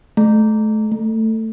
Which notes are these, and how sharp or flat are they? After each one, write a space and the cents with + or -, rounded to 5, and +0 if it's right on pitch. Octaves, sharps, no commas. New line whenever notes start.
A3 -25
A3 +15